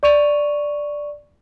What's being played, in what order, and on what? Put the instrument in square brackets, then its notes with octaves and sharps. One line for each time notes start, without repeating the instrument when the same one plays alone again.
[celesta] D5 C#6 D#7 F7